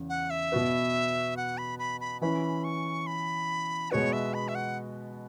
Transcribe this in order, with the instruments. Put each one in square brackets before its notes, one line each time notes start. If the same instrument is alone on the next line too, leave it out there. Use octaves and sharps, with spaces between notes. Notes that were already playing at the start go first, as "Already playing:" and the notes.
Already playing: [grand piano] E2 C#3
[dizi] F#5
E5
[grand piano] B2 B3 F#4 B4
[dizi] F#5
B5
B5
B5
[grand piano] E3 C#4 E4 B4 [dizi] B5
[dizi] C#6
B5
[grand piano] B2 G#3 B3 F#4 B4 [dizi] C#5
[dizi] E5
B5
E5
F#5